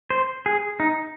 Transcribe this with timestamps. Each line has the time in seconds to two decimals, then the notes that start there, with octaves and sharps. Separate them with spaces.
0.10 C5
0.46 G#4
0.80 D#4